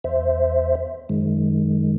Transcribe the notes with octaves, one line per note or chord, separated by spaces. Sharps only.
E2 C5 E5
F#2 D#3 G#3